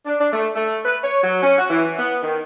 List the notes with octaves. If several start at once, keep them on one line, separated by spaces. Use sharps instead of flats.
D4
D4
A3
A3
B4
C#5
F#3
C#4
F#4
E3
B3
D#3